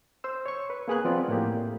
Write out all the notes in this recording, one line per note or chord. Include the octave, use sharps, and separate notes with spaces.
C5 E6
C#5 C#6
B4
A#3 B3 G#4 B4 D#6 F#6
F3 B3 C4 F4 D5
A2 A#3 G4